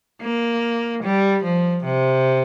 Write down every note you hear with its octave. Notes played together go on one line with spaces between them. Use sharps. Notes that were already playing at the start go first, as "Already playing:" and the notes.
A#3
G3
F3
C3